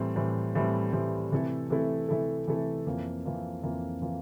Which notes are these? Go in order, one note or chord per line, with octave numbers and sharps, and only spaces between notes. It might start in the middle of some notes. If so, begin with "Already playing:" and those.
Already playing: A2 E3 G3 C4
A2 E3 G3 C4
A2 E3 G3 C4
A2 E3 G3 C4
C3 E3 A3 E4 A4
C3 E3 A3 E4 A4
C3 E3 A3 E4 A4
C3 E3 A3 E4 A4
F2 E3 A#3 F4
F2 E3 A#3 F4
F2 E3 A#3 F4
E3 A#3 F4